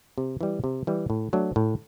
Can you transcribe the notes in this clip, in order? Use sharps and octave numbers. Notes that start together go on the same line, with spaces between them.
C3
E3 G3
C3
E3 G3
A2
F#3 A3 D4
A2